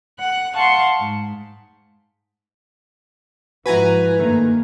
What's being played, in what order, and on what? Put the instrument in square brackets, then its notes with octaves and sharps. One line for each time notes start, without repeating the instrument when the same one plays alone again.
[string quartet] F#5 F#6
F5 F#5 A5 C6 C#6
G#2
[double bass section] G#2 F3 [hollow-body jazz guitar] E4 F#4 [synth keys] B4 G#5 A#5
[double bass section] G2 A#3 [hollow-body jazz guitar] D#3 A3